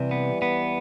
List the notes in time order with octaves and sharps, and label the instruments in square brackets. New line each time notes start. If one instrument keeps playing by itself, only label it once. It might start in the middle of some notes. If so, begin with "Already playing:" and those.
Already playing: [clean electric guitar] C3 [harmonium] E3 G3
[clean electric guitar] B3
B3